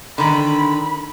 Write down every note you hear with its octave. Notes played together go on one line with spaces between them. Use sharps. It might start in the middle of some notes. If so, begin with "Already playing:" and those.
D3 D#3 B5